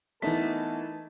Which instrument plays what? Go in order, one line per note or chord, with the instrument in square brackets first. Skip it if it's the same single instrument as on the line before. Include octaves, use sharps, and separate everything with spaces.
[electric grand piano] E3 B6 [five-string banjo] A3 D#4 [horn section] B3 A#4 A5